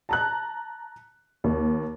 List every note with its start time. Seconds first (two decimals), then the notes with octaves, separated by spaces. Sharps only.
0.09 A5 A#5 F#6
1.44 D#2